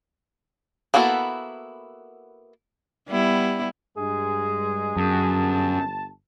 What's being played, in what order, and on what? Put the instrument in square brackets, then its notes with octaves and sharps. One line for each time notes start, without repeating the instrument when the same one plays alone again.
[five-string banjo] A#3 B3 E4 F#4 A4
[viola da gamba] G3 B3 E4
[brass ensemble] G2 G#3 [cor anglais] G#4
[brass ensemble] G1 A5 [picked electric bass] F#2